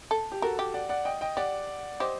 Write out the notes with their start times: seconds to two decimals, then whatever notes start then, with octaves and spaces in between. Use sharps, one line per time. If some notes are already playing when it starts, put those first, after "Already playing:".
0.11 A4
0.32 G4
0.42 F#4 A4 A#4
0.59 G4
0.74 D5 F#5
0.89 D5 F#5
1.05 D#5 G5
1.21 D#5 G5
1.37 G4 D5 F#5
2.00 G4 C5 D#5